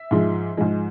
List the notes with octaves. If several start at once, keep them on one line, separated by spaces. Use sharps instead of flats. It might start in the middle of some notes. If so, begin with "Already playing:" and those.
Already playing: E5
G#2 F3 G#3
G#2 F3 G#3